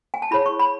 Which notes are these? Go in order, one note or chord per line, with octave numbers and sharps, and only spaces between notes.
G#5
A5
E4 G#4 C#5 B5
C#6
B5